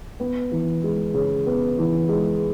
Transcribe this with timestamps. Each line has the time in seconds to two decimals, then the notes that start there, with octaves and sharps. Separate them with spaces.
0.20 B3
0.51 E3
0.84 G#3
1.14 C#3
1.46 B3
1.78 E3
2.09 G#3